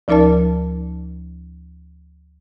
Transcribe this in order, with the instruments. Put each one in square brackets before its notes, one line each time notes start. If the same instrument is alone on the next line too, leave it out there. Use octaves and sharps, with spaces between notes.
[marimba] D2 F3 D#4 A#4 D5 A5